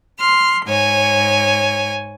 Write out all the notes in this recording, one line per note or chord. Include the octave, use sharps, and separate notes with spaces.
C6 F6
G#2 C#5 G#5